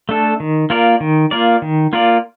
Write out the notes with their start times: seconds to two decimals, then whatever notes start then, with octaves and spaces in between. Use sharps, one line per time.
0.09 A3 D4 A4
0.40 D#3
0.70 A#3 F4 A#4 D5
1.00 D#3
1.31 A#3 F4 A#4 D5
1.62 D#3
1.93 A#3 F4 A#4 D5